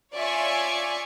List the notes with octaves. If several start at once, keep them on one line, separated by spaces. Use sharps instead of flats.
F4 C#5 D5 E5 G#5 C#6